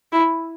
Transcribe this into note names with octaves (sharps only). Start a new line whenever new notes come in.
E4